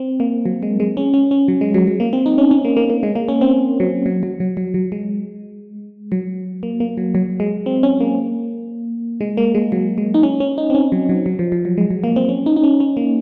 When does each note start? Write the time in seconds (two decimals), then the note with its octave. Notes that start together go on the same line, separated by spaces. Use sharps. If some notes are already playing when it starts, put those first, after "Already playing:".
Already playing: C4
0.20 A#3
0.46 F#3
0.63 G#3
0.80 G#3
0.97 C#4
1.14 C#4
1.31 C#4
1.48 F#3
1.61 G#3
1.74 F#3
1.87 F#3
2.00 A#3
2.13 C4
2.26 D#4
2.38 C#4
2.51 C#4
2.65 A#3
2.77 A#3
2.90 A#3
3.03 G#3
3.15 A#3
3.28 C#4
3.41 C4
3.80 F#3
4.06 F#3
4.23 F#3
4.40 F#3
4.57 F#3
4.74 F#3
4.92 G#3
6.12 F#3
6.63 A#3
6.80 A#3
6.97 F#3
7.15 F#3
7.40 G#3
7.66 C4
7.83 C#4
8.00 A#3
9.21 G#3
9.37 A#3
9.55 G#3
9.72 F#3
9.98 G#3
10.14 D#4
10.23 C#4
10.40 C#4
10.58 D#4
10.70 C4
10.75 C#4
10.92 F#3
11.09 F#3
11.26 F#3
11.39 F3
11.52 F3
11.65 F#3
11.78 G#3
11.91 F#3
12.04 A#3
12.16 C4
12.29 C#4
12.46 D#4
12.56 D#4
12.63 C#4
12.80 C#4
12.97 A#3